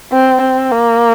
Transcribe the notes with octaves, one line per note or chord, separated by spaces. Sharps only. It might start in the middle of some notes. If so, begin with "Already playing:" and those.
C4
C4
A#3